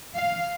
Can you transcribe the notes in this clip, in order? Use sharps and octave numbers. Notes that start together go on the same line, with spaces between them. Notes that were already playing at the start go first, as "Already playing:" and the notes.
F5